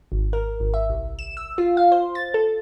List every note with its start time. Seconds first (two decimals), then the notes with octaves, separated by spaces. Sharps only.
0.12 G#1
0.33 A#4
0.60 G#1
0.74 E5
0.89 C2
1.19 E7
1.37 E6
1.58 F4
1.77 F5
1.92 C5
2.15 A6
2.34 A4